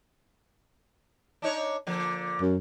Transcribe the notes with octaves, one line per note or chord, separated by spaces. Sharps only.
D4 D#4 C#5
D3 F3 A#3
F#2